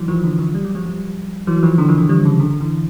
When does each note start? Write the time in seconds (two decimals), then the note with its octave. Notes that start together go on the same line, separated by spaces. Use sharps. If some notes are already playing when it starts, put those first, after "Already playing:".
Already playing: E3 F#3
0.08 D#3 F3
0.24 D3 E3
0.39 D#3 F3
0.55 G3
0.65 F#3
0.75 F3 G3
0.85 F3 G3
1.47 E3 F#3
1.63 D#3 F3
1.78 D3 E3
1.89 D#3 F3
1.98 D3
2.09 F3 G3
2.25 C#3
2.40 D3
2.50 D3
2.61 D3 E3